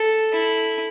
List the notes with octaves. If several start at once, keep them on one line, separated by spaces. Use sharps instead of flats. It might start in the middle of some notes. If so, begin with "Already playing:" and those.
Already playing: A4
E4